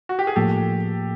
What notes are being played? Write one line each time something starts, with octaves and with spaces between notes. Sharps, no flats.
F#4
G4
G#4
A2 F3 A#3 G4 A4